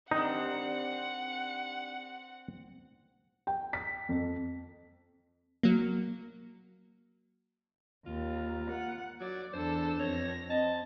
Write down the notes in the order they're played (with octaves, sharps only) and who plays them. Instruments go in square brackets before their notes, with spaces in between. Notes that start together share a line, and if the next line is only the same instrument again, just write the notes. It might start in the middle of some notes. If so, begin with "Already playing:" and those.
[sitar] D#3 G3 D4 [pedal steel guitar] C4 [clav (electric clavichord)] D#4 [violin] F#5
[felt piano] G5
B6
F2
[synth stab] F#3 A#3
[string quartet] D#2 [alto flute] A#3 [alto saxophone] F4
[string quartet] F#5
[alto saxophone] F#3 [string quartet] D5
[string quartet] E2 A4 E6 [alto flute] D4 [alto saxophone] C5
[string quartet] F2 A#6 [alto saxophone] C#5
[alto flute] C4 [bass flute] D#5 [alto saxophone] A5